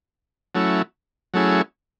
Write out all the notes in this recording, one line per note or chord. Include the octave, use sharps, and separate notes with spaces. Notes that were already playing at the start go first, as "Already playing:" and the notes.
F#3 A3 C#4 E4
F#3 A3 C#4 E4 G#4